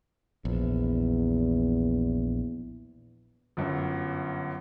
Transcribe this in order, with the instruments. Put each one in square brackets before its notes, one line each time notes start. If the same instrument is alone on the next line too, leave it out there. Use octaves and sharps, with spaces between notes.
[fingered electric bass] A#1 [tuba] E2
[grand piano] G1 F#2